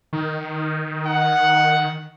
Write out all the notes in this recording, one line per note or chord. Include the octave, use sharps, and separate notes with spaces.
D#3
F#5